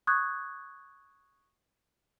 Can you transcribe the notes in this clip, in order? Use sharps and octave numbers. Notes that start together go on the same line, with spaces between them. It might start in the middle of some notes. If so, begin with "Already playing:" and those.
C#6 D#6 F#6 G#6